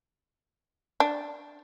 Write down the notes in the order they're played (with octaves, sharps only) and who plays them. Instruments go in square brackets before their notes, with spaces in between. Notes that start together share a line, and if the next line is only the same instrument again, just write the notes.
[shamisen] D4